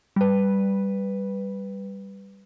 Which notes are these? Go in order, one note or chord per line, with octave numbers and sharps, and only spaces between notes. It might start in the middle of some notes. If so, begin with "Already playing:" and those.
G3 B4